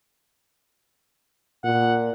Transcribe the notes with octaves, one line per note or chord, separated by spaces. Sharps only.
A#2 F#5